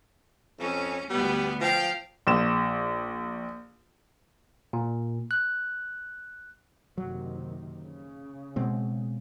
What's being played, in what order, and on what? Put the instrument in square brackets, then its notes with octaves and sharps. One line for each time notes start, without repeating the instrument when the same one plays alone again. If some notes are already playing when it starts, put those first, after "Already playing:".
[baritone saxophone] F2 [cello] C#4
[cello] D2 B3 [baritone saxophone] G3
[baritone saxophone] F3 [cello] F5 G5
[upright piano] A#1 E7
[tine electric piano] A#2
F#6
[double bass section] F#1 C3 D#3 [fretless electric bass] F#3
[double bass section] C#3
[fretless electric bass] B2 G#3 C4